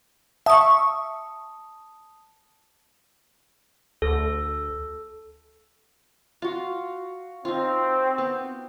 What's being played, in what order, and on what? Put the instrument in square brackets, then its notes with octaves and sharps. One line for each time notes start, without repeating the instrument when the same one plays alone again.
[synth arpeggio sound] E5 C#6 [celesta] A5 D#6
[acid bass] D2 [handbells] A4
[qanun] F4 [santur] F#4 F5
[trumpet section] C4 [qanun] D#4 F4
[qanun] B3